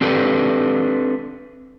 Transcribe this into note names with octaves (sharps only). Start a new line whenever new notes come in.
C4 D4 G4 A4 B4